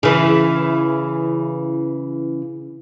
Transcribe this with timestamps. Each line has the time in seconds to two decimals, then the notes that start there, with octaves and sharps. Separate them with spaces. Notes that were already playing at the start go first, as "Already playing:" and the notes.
0.03 C#3 E3